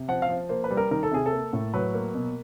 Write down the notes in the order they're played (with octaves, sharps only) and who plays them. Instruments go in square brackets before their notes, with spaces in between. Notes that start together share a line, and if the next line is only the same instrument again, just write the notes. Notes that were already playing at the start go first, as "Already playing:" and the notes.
Already playing: [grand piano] C3
F3 F#5
F5
F3
A#3 C5
B4
G3
A#4
D#3 A#4
A4
C3 G#4
A4
A#3
A2
F#3 B4
A#3
B2